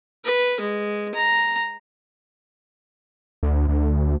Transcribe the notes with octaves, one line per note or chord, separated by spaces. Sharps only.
B4
G#3
A#5
D2
D2